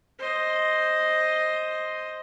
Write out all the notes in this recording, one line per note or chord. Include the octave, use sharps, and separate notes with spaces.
C5 D#5